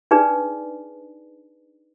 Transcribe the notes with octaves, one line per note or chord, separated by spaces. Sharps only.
D4 D#4 G#4 B4 D5